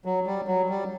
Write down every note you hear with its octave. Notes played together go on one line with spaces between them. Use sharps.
F#3
G3
F#3
G3